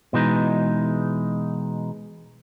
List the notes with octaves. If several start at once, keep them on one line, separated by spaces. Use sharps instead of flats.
B2 E3 G#3 D#4